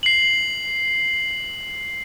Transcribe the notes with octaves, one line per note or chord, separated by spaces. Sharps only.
C7 F#7